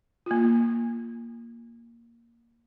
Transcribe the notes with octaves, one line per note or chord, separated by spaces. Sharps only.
A#3 F4